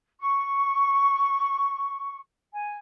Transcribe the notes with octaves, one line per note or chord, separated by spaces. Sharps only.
C#6
G#5